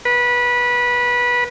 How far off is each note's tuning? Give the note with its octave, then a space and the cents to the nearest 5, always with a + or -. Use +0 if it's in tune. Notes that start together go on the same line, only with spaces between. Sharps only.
B4 -20